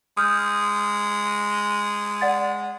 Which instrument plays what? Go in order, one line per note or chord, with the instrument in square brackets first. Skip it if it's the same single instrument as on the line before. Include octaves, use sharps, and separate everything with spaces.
[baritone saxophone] G#3 [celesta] D#6 F6 G6
[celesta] D5 F#5 A6